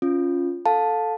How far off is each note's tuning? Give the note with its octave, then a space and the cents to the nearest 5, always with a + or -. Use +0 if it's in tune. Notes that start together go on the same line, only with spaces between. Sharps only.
C#4 +0 F4 +0
A4 +0 F5 +25 A5 +0